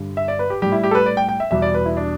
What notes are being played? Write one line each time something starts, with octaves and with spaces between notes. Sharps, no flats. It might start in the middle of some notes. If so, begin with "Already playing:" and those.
Already playing: G2 D3 G3
E5
D5
B4
G4
A2 G3 G4
E4
G4
A4
B4
D5
G5
G5
E5
E2 B2 G3 E5
D5
B4
E4
D4